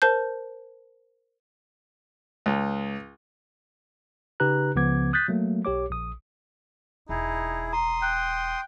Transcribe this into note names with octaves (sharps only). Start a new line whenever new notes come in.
A#4 C5 A5 G6
C#2
C#3 D#4 G4 B4 A#5 F#6
C#2 C#3 F3 B3 D6 G#6
D#6 F#6 G6 A6 B6
F#3 A3 A#3
B1 G4 C#5 D6
A#1 D#6
E1 D#4 E4 G#4
A#5 C6 D#6
G5 F#6